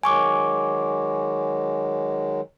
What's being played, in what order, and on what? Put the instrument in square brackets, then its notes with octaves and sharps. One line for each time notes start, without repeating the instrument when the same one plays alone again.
[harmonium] D#3 F#3 G#3 [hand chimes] G#5 C#6 D6